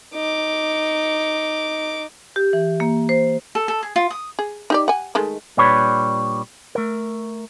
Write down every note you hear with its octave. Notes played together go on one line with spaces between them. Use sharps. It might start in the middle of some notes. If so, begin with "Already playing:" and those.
D#4 D6
G4
E3
A#3
C5
A4
A4
G#4
F4
D#6
G#4
D#4 G4 D5
F#5 G#5
D#3 G#3 A3
A#2 G3 D4 B4 C#5 B5
A3 A#4